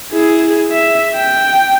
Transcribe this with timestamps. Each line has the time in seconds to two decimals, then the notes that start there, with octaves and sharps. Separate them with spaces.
0.13 E4 G#4
0.71 E5
1.15 G5